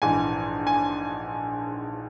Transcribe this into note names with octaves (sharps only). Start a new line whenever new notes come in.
A#1 G#2 E3 G#5
G#5